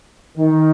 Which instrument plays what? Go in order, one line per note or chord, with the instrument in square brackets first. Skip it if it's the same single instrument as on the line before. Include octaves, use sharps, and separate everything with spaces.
[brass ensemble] D#3